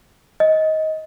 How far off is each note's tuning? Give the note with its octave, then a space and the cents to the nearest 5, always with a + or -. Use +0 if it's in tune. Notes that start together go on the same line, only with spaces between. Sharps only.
D#5 +20